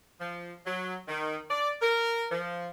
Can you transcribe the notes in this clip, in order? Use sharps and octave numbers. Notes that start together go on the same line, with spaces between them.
F3
F#3
D#3
D5
A#4
F3